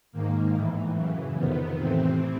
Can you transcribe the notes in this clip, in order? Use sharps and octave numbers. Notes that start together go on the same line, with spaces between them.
G#2 D#3 A#3
A2 E3
F#2 C#3 E3
F2 C3 D#3 B3
A2 C3 E3 C4